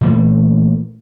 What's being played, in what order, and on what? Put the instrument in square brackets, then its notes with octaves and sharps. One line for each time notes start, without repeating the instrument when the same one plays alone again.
[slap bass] A#2 E3 A3 A#3